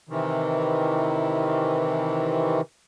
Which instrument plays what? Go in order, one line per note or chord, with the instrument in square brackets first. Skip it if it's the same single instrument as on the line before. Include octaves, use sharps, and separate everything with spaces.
[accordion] C3 D#3 E3